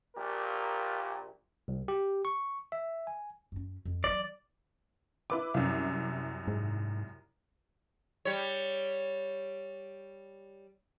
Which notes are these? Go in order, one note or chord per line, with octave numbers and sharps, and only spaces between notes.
A#1 A#2 G4 A#4
C2
G4
C#6
E5
G#5
F#2 C#4
F2
E3 F#3 D5
E4 B4 D6
C2 F#2
G#2
G3 C#5